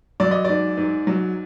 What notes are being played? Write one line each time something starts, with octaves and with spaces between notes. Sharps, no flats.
F#3 D5
D#5
G#2 D5
G#2
F#3